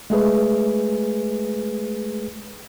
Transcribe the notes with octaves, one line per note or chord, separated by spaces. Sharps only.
G#3 A3 G#4 B4